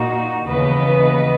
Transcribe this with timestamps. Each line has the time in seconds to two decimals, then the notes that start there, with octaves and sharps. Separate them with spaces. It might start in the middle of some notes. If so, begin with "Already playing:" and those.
Already playing: A#2 A#3 D#4 F#4
0.47 D#2 C#3 E3 B3 B4 D#5